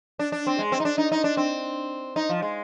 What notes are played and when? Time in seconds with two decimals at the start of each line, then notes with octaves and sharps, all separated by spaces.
0.19 D4
0.32 D4
0.47 C4
0.59 G#3
0.72 C4
0.80 D#4
0.85 D4
0.98 D#4
1.12 D#4
1.24 D4
1.37 C4
2.16 D#4
2.29 F3
2.42 G#3